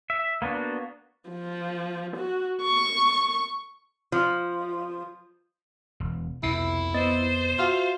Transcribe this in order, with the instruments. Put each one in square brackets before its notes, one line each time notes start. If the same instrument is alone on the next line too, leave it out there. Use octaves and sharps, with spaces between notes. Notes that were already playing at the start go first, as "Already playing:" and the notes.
[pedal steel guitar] E5
A#3 B3 D4 F#4
[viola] F3
F#4
C#6
[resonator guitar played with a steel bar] F3
[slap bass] E1
[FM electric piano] C2 [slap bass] F2 B2 [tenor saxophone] E4
[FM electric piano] B3 D#5 A6 [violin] C5
[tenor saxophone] F4 [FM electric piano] F#4 E5